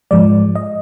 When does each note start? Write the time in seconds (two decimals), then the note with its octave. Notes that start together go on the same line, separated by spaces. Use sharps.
0.11 G#2 F3 G#3 D5
0.55 D#5